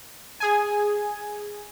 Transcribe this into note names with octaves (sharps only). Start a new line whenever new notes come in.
G#4 G#5